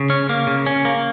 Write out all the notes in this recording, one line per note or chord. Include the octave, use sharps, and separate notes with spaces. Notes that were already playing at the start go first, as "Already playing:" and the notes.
Already playing: C#3
C#4
A#3
C#3
C#4
A#3